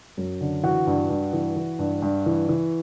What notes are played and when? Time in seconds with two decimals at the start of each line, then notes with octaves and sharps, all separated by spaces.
0.17 F#2
0.41 D3
0.63 E3 F#4 F#5
0.87 G2
1.10 G2
1.33 E3
1.56 E3
1.79 G2
2.02 G2
2.26 E3
2.49 E3